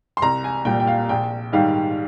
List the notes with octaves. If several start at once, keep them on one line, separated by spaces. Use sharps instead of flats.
C6
C2 A#5
G#5
A#2 G3 G5
G5
F5
A#1 G5
G#2 D#3 G3 F5